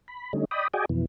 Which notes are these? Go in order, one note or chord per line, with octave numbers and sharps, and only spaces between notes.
B5
D3 G3 A3 C#4 D#4
D5 D#5 G5 B5 D#6
F#4 G#4 D5 D#5 G5 G#5
F2 B2 E3